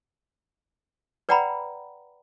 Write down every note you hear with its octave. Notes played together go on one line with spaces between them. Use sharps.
B4 D5 F#5 G5 A#5 B5